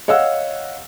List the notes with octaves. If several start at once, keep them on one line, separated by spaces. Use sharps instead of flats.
C#5 D#5 F5 F#5 E6